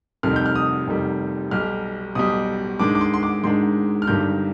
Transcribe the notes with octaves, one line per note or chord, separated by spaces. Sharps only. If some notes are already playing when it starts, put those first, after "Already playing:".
F1 F2 D#3 G3 F6
G6
F6
D#6
F1 F2 D#3 G3
B1 B2 G3 F6
B1 B2 G3 D#6
G#2 D#3 G#3 D4 D6
D6
C6
C6
D6
G#2 D#3 G#3 D4 C6
F6
G1 G2 D#3 G3 D4 G6